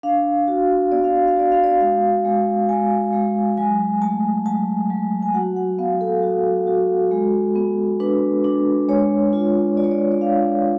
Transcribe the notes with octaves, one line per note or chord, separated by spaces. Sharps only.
D4 F5
F#4
B3 D5
F5
D5
F5
F#4 D5
F5
D5
G#3 F5
G#3
G#3 G#5
G#3
F#3 G#5
A3 A5
F#3 A5
F#3
G#5
F#4 F#5
F#5
B3 F5
A4
F#4
F#4
G#3
B3
D4 B4
D4
G#3 C#5
F4
F4 D5
C#5
D5
D5
D4 F5